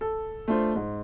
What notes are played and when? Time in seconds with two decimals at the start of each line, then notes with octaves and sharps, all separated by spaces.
0.01 A4
0.48 A3 D4 F4 C5
0.75 G#2